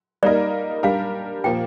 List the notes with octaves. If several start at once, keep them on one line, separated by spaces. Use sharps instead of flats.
G3 A#3 D#4 A#4 D5 D#5
G3 D4 G4 A#4 F5
A#2 F3 A#3 G5